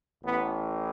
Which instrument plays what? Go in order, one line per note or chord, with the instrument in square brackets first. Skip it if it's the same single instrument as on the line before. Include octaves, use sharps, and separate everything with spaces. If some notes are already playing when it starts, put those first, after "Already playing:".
[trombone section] A1 A2 E3 B3